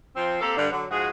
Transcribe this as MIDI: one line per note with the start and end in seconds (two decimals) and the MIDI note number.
0.16 0.39 53
0.16 0.39 60
0.41 0.56 58
0.41 0.56 60
0.41 0.56 67
0.41 0.56 69
0.57 0.67 43
0.57 0.67 50
0.71 0.85 50
0.71 0.85 54
0.90 1.09 44
0.90 1.09 53
0.90 1.09 56
0.90 1.09 66
0.90 1.09 68